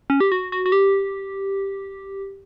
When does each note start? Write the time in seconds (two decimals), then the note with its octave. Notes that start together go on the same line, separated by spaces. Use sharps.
0.10 C#4
0.20 G4
0.32 F#4
0.52 F#4
0.66 F#4
0.72 G4